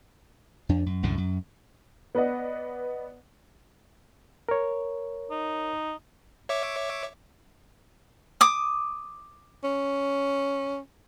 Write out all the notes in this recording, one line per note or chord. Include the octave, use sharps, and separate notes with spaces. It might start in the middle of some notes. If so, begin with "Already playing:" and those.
F2 D4
F#2
C2 F#2 A2 D3
F#2
B3 B4 D5 D#5 F#5
A#4 C#5
D#4
C#5 E5 D6
D6 D#6
C#4